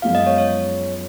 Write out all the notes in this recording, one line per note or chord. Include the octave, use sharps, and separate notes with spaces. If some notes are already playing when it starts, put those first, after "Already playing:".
F#2 F3 G#3 B3 F4 F5
D#5
C#5
C#5